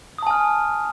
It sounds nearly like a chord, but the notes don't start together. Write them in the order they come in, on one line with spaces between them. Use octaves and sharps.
D#6 A5 G#5 F6